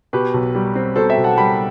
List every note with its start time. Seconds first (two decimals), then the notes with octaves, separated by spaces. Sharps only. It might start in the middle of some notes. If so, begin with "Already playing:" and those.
0.13 B2 G4 B4
0.34 B1
0.55 G3
0.75 C4
0.96 B2 A4 C5
1.09 E5 G5
1.17 B1
1.24 F#5 A5
1.37 G3 G5 B5